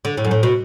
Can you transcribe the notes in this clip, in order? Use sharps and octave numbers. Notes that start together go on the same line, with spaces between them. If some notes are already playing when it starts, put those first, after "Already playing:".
D3
A2
F#2
A2
B2